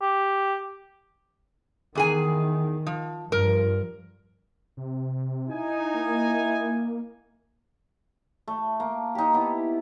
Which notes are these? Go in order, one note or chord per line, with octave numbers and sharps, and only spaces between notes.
G4
E2 D#3 G#4 G#5
F3
G2 F3 A#4
C3
D#4 E4 G#5
A#3
A3
A#3
D#4 G4
B3 E4